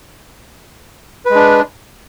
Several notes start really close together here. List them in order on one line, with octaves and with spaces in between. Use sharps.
B4 G#3 D4